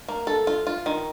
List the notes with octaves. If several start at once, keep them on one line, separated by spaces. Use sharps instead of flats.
A#3
A4
F4
F4
D#3